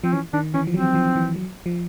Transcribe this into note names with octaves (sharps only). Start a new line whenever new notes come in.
F3 C4
E3 C#4
D#3 D4
E3 C#4
F3
F#3 C4
F3
E3
F#3
F3